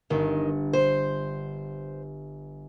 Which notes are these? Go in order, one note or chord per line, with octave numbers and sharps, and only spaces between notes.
G1 D#3
C5